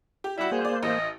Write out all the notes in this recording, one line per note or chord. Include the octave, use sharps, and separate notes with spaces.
G4
G3 E4 F#4
A#3 G#4 C5
D5
A1 D#5